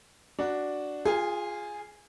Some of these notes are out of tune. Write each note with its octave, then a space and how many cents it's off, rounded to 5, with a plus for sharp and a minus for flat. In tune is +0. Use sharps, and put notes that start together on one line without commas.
D4 +0 F#4 +0
F4 +0 G#4 +0 G#5 -45